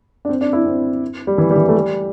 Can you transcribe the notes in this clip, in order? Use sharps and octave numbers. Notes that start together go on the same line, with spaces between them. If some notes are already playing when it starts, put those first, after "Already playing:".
D4
C4
D4
E4
C4
G3
E3
G3
E3
A3
G3